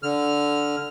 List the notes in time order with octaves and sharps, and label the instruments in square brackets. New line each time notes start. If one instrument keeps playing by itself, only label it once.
[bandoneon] D3 F6